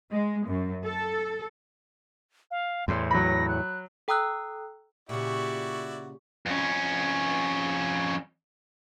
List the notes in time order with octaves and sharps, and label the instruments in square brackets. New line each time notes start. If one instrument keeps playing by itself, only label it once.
[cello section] G#3
F#2
A4
[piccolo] F5
[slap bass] E2 A2 [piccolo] C6
[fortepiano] F#3 B5 [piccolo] A#6
[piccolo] F#6
[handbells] A4 G5 A#5 D#6 E6 F#6
[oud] A#2 C#3 [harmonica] E4 F#4 D5 [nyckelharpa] G4 C#6
[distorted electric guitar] F2 C#4